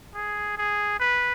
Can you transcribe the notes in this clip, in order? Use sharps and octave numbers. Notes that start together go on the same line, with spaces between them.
G#4
G#4
B4